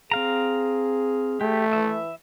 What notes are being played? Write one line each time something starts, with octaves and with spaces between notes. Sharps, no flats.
C4 G#4 F5 A#5
A3 G4
E3 E5